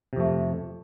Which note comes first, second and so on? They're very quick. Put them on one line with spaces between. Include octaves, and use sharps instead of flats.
C3 F2 A3